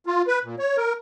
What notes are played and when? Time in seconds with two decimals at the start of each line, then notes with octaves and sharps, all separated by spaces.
0.06 F4
0.27 B4
0.44 A#2
0.59 C#5
0.77 A#4